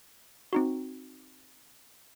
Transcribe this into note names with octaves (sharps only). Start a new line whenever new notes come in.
C4 D#4 F#4